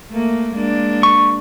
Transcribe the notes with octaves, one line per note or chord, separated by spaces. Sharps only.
A3 A#3
G#3 A#3 D4
C#6